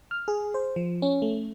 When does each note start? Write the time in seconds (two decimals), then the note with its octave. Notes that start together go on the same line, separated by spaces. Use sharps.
0.11 F6
0.28 G#4
0.54 C5
0.76 F3
1.02 C#4
1.22 A3